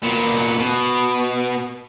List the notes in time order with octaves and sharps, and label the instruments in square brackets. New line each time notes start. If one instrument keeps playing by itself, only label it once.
[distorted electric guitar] A#2 B3
B2